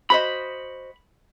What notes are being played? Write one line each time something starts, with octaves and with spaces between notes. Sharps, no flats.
F#4 C5 D#5 B5